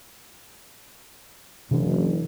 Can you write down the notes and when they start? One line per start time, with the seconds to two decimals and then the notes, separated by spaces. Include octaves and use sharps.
1.71 F#1 C3 E3 D4